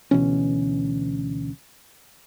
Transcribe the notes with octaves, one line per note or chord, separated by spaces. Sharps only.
D2 B2 E3 C#4